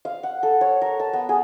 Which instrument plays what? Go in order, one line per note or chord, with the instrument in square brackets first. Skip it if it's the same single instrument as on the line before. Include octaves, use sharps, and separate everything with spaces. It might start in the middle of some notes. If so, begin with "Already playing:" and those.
[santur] F5
F#5
A4
C#5
A#4
A5
B3
G#4